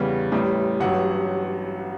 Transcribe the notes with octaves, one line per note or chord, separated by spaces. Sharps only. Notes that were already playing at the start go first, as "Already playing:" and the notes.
Already playing: E2 C#3 G3
A1 A2 G3
A1 G2 F#3 F#5